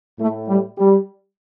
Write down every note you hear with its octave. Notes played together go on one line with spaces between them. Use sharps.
A2 A3
G3
G3